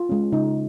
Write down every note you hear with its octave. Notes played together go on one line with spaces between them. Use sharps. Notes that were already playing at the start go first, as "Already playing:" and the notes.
Already playing: F4
G#3 C#4
C#3 D#4